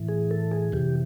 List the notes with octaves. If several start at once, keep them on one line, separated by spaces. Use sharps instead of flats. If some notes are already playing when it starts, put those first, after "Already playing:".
Already playing: A2 E3
G#4
A4
G#4
F2 C3 E3 G4